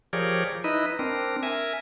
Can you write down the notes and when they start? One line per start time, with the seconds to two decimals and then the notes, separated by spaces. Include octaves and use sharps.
0.13 F3 G4 G#4 A#4 C#5 D5
0.64 D#4 E4 B4 D#5
0.99 C4 D4 A#4
1.43 A#4 E5 G#5